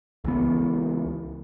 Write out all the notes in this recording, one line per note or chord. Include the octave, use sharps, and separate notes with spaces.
C#2 E3 B3